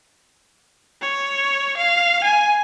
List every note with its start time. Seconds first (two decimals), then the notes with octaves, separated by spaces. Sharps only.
1.02 C#5
1.77 F5
2.24 G#5